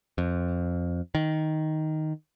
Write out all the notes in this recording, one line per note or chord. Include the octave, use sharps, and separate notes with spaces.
F2
D#3